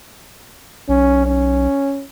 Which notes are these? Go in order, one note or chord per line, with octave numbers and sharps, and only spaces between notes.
B1 C#4
C#4